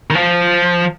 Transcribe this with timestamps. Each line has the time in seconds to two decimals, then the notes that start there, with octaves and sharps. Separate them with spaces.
0.10 D#3
0.15 F3